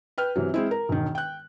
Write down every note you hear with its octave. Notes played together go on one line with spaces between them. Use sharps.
B4 G5 F6
C3 E3 F#3
G#3 C4 E4
A#4
E1 D#3
G5 F#6